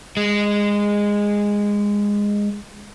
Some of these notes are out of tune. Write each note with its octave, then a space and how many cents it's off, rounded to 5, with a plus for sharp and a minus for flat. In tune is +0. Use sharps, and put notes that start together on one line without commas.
G#3 -15